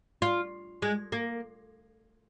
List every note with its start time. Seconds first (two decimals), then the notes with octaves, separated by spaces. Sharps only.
0.22 F4
0.82 G#3
1.12 A#3